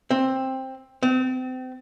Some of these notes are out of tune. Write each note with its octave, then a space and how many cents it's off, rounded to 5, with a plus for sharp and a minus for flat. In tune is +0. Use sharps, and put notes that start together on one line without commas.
C4 +10
C4 -35